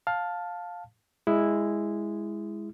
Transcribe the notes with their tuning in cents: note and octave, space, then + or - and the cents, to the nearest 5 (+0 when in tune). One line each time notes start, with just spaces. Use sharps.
F5 +15 A5 +0
G#3 -10 E4 +0